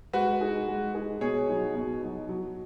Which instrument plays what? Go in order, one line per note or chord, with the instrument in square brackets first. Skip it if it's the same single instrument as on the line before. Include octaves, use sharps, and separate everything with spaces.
[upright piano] G#3 [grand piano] F#4 B4
[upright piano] D#4 G#4
G#3
D#4 G#4
[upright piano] B2 [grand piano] G#4 C#5
[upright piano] F#3 D#4
B2
F#3 D#4
F#3